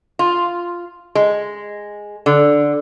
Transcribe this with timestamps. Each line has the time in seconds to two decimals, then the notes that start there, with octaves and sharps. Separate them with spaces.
0.19 F4
1.15 G#3
2.26 D3